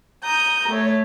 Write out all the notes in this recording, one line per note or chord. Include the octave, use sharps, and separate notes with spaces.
A#5 D#6 G6
A3 C#5